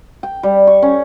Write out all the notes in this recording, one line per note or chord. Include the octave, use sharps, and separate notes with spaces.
G5
G3
C#6
C#4